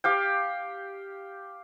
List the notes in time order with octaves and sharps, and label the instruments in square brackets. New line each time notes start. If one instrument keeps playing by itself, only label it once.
[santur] G4 F5 G5